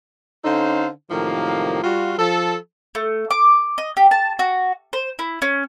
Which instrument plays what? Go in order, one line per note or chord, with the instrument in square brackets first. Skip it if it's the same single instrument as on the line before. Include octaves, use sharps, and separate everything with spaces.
[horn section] D3 C#4 D#4 A4 C5 F5
A2 C3 D#3 F3 F#3 A#3
G3 F4 F#4
F3 A4
[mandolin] A3
D6
D#5
G4
A5
F#4
C5
E4
C#4